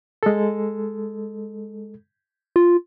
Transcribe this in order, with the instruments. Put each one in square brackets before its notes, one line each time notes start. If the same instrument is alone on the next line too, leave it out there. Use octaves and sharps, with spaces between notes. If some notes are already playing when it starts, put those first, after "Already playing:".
[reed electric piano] G#3 A4
[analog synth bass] F4